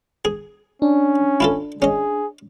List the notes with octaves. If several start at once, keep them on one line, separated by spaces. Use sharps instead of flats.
G#4
C#4 D4
E4 F4 A4
C#4 G#4 D#5